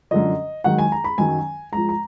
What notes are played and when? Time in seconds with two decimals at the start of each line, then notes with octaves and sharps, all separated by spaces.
0.11 F#2 D3 F3 D#5
0.64 G#2 D#3 F#3 F#5
0.79 G#5
0.92 A#5
1.04 B5
1.18 F#2 D#3 F#3 G#5
1.72 G#2 F3 A#5
1.89 A#5